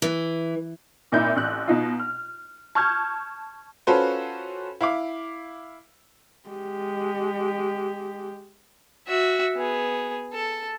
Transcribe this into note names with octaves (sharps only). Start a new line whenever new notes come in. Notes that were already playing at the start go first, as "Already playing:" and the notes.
E3
G#1 A#2 D#4 E4 G6
A1 F#6
B2 D#4 F4
F6
A5 C#6 F6 G6 G#6
C#4 F4 F#4 A4 B4 C5
E4 F5 D6
G#3 G4
F#4 E5
B3 G#4
A4